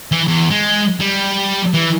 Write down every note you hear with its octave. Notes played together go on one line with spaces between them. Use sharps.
E3
E2
G#3
G3
E3